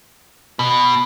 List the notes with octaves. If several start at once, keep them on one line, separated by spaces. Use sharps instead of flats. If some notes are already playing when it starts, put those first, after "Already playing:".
B2